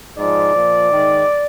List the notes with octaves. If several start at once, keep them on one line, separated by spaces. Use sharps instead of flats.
G#2 F3 D5
A#2 F3
G#2 D#3